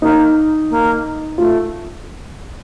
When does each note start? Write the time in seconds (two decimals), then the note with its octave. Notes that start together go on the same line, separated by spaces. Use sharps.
0.02 A#3 D#4
0.70 A#3
1.38 A3 F4